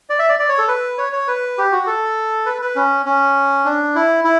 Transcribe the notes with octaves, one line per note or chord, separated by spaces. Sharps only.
D5
E5
D5
D5
C#5
A4
B4
C#5
C#5
B4
G4
F#4
A4
B4
B4
C#4
C#4
D4
E4
E4